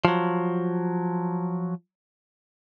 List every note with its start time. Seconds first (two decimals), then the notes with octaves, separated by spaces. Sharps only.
0.05 F3 F#3